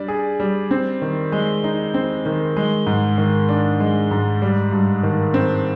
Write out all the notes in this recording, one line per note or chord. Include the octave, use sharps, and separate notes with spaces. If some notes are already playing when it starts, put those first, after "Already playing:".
Already playing: G3 D4 D5
G#4
G3
C4
D#3
G#3
D#4
C4
D#3
G#3
G#2
D#3
D4
G#3
G#2
G3
G2
D#3
C4